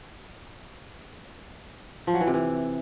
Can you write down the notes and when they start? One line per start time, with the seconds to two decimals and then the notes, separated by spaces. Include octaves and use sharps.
2.07 F3
2.14 F#3
2.21 E3
2.27 C3
2.34 E3